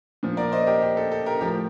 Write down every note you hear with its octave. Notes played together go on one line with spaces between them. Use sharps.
A#2 F3
A#4 D5
C5 D#5
G4 A#4
G4
A4
A4
G4 A#4
A2 F3 G4 A#4